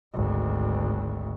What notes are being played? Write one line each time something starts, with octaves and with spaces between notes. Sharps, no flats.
G#1 D2